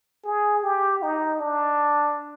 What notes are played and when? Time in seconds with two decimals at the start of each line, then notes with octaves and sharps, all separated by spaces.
0.25 G#4
0.63 G4
1.02 D#4
1.40 D4